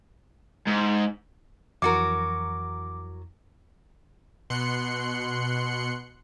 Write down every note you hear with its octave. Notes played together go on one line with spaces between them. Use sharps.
G#2
F2 E3 F#3 F#4 A#4 D6
B2 C6 F#6 C#7